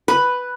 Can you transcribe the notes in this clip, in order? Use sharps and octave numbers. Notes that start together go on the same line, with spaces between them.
B4